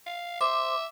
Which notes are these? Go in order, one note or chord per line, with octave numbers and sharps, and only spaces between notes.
F5
C5 E5 D6